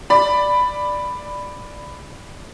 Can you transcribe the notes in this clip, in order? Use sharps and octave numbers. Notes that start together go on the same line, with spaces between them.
D5 B5